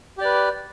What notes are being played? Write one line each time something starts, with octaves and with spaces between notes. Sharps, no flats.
G4 B4 D5